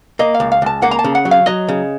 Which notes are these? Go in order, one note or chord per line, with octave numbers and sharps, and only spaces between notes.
A#3 D#5
F5
C#2
F5
C#2 A5
A#3 F#5
A#5
A5
C#3
F#5
F#3
F5
F#3 D#5
C#3